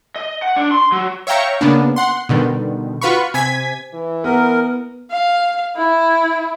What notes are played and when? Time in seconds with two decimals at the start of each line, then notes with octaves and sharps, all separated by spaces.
0.16 D#5
0.42 F#5
0.56 D4
0.72 C6
0.92 F#3
1.27 C#5 E5 F5 G5 A#5 C#6
1.61 C#3 A#3 B3 D4
1.96 F#5 C6
2.29 B2 D3 D#3 G3
3.01 F4 F#4 B4 F5 B5 C#6
3.34 C3 G#5 G#6 B6
3.94 E3
4.24 B3 A#4
5.10 F5
5.76 E4